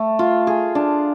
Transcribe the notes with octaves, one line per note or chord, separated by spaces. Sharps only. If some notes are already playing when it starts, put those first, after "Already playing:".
Already playing: A3
F4
G#4
D4